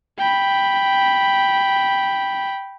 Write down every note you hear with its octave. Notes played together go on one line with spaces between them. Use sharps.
G5 B5